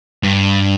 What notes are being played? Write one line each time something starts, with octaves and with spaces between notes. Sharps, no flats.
G2